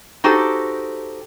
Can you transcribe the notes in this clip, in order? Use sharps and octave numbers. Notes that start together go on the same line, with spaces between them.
D#4 F#4 G4 A4 C5